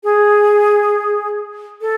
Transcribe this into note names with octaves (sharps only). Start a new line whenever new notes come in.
G#4
A4